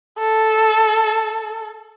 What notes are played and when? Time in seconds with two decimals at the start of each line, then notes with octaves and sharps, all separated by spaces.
0.18 A4